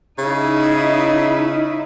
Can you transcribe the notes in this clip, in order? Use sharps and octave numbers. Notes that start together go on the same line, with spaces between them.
C#3 D#4 E4